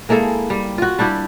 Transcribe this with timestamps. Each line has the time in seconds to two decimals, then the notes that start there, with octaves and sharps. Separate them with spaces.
0.09 G#3 A#3 E4 A4
0.50 G3
0.78 F4 F#4
0.99 G3 D4 E4 G4